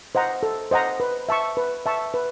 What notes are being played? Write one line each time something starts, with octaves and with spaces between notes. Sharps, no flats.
C5 D#5 F#5 A#5
A4
C5 D#5 F#5 A#5
B4
E5 A5 C#6
B4
E5 A5 C#6
B4